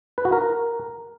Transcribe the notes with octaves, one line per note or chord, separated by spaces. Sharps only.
B4
F#4
A#4